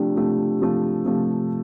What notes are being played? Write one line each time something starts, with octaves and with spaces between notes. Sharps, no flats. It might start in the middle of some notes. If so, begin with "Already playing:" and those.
Already playing: C3 F3 A3 D4 G4
C3 F3 A3
C3 F3 A3
C3 F3 A3